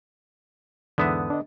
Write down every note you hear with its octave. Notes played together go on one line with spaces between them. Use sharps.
E2 G#2 D3 B3 E5 D#6
D4 D#5